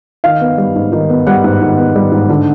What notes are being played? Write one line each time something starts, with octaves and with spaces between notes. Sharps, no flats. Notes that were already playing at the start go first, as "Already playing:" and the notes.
D#3 F5
B3
G3
G#2
D#3
B3
G3 F#5
G#2
D#3
B3
G3
G#2
D3